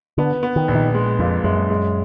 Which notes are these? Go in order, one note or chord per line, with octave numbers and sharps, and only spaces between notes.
D3 B3
B3
D#3
A#1
D#3
G#3
F2 A#2
F#2 G#3
G#3